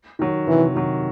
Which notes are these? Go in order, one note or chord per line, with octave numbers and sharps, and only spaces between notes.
D#3 F#3
C3 E3
D#3 F#3